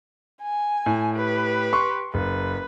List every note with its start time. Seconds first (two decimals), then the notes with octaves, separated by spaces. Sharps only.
0.42 G#5
0.86 A2
1.15 G4 B4
1.73 C6 C#6
2.14 F#1 B4